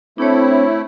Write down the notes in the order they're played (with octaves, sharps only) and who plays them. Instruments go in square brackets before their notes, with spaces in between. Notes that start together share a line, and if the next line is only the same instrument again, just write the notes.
[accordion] A3 E4 [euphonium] C4 [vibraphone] D4 C#5